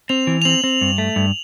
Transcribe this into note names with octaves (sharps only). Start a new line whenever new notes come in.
C4 F7
E3
F7
C4 F#7
C4
G2
A3
G2